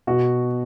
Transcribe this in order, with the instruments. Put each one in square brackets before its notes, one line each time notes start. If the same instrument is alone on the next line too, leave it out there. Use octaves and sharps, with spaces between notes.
[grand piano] B2 F#4